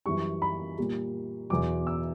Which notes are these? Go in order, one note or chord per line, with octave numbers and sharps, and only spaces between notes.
F#2 E3 G3 C#6
B5
A#2 G3
E2 B2 F#3 D6
E6